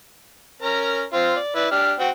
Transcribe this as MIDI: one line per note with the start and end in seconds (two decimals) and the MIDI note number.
0.62 1.03 61
0.62 1.03 70
0.62 1.03 82
1.13 1.35 60
1.13 1.35 65
1.13 1.35 72
1.36 1.53 74
1.55 1.66 64
1.55 1.66 71
1.55 1.66 74
1.71 1.93 62
1.71 1.93 67
1.71 1.93 89
1.99 2.09 60
1.99 2.09 66
1.99 2.09 79